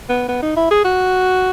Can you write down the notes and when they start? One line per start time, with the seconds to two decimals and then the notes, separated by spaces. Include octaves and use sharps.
0.10 B3
0.29 B3
0.42 D#4
0.57 E4
0.71 G#4
0.85 F#4